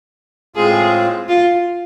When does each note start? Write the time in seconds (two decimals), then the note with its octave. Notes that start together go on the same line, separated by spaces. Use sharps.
0.56 A2 G#3 C4 F4 G#4
1.29 F4